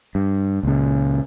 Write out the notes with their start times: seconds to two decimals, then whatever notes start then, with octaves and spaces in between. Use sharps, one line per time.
0.15 G2
0.63 C#2 A#2 C#3